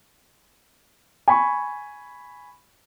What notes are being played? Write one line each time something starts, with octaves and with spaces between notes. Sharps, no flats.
G#5 B5 C#6